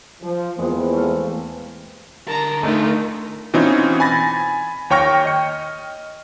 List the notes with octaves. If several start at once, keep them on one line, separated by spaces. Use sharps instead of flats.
F3
E2 C3 E3 G#3 A#3
A3 F5
D3 A#4 A5 A#5
G#3 A3 D4 D#4 F4
B2 E3 C4 C#4 D#4 F4
G#5 B5 A6 A#6
D#2 C#5 G5 C#6 F6 A#6
D#5 C#7